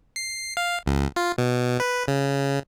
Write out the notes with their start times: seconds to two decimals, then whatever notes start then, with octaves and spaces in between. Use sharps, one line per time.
0.16 C7
0.57 F5
0.86 C#2
1.16 F4
1.38 B2
1.80 B4
2.08 C#3